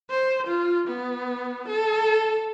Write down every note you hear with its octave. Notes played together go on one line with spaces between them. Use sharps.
C5
F4
B3
A4